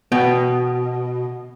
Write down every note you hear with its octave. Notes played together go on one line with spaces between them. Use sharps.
B2 B3 G5